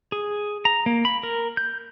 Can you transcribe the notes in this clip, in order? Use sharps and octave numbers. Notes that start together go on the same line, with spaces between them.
G#4
A#5
A#3
B5
A#4
G6